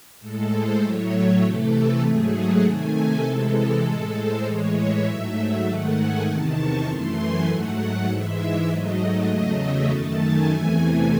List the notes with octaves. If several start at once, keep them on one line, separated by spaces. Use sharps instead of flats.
A2 G#3 A4
C5
A2 F#3 A3 C#5
C3 E3 A3 A4
G#2 F#3 A3 G#4
F#5
C3 D#3 A3 G#5
A4
C3 E3 G#3 A4
A4
A2 G#3
C5
A2 E3 G#3 C#5
E5
G#2 F#3 A3
G#2 D#3 A3 F#5
G#5
E2 C3 D#3 A5
C#6
F#2 E3 A3 C6
G#5
G#2 F#3 A3 F#5
G#2 E3 G#3 E5
G#2 F#3 A3 D#5
D#5
E2 C#3 F#3 A3
E5
F#2 D#3 A3 A5
G#5
E2 C3 E3 A3